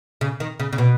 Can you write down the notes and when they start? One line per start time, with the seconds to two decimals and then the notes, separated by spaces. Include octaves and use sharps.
0.21 C#3
0.40 D#3
0.60 C#3
0.73 C#3
0.78 B2